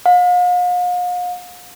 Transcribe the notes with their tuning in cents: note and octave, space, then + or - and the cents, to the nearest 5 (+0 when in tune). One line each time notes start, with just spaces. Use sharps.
F5 +40